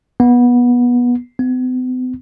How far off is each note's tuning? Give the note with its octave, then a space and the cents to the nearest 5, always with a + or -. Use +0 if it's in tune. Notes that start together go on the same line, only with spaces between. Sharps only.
B3 -20
B3 +45